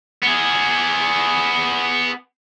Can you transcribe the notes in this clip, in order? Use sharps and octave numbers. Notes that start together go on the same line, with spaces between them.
B3 G#4